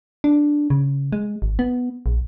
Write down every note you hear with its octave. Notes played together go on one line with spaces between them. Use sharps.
D4
C#3
G#3
G#1
B3
A#1